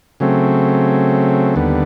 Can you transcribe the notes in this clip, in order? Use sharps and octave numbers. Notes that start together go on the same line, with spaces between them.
C#3 F#3 A3 C4
D#2 D3 G3 B3